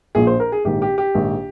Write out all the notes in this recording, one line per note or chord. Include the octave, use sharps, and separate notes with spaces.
A#1 A#2 F3 G#4
C5
A#4
G#4
A#1 G#2 D#3 G4
G4
G4
A#1 G#2 D#3